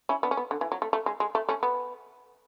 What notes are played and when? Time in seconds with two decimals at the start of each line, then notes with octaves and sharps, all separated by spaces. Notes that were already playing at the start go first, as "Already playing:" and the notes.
0.09 C#4 E4
0.23 B3 D4
0.31 C#4
0.37 B3
0.51 D3
0.61 E3
0.72 F#3
0.82 A3
0.93 A3
1.06 G#3
1.20 G#3
1.35 A3
1.49 A3 C#4
1.63 B3